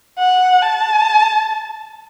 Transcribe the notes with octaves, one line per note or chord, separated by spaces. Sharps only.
F#5
A5